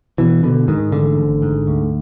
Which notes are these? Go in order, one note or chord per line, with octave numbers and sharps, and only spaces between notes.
B2 E3
B2 D3
G#2 D#3
A1 D3
G#1
G#2
D2